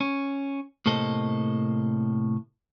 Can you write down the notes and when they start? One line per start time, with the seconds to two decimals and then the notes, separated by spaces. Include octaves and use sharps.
0.01 C#4
0.86 A2 C3 A#3 A4 C5 D#5